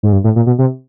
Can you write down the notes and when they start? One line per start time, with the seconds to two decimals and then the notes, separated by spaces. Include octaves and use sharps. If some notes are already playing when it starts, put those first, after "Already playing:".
0.03 G#2
0.13 G2
0.24 A2
0.36 A#2
0.47 B2
0.59 C3